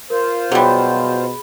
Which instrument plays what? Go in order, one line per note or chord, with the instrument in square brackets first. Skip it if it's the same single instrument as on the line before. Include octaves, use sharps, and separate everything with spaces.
[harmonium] F4 C5 [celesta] A#4
[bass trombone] B2 [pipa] F#3 G3 [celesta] G#4 B5